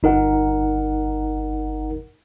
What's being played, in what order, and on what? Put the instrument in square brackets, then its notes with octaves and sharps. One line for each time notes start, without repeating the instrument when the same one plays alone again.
[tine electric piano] G1 D#4 A#4 F#5